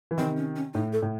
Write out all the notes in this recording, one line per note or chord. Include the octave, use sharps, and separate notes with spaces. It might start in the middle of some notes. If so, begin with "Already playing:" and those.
E3
C3 D#3 C4
C#4
C#4
A2 D#4
A4
A2